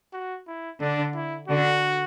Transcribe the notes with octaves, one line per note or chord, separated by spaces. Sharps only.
F#4
E4
D3 D4
E4
D3 F#4